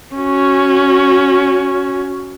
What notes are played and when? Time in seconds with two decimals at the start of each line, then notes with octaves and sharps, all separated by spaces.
0.16 C#4 F#4